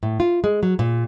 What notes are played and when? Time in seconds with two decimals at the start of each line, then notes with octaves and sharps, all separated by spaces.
0.03 A2
0.20 F4
0.44 G#3
0.63 F#3
0.79 A#2